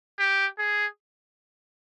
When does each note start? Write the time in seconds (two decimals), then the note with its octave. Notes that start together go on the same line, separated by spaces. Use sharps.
0.19 G4
0.59 G#4